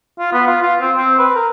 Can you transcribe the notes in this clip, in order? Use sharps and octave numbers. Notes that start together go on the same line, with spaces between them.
F4
B3
F4
F4
C4
C4
B4
A#4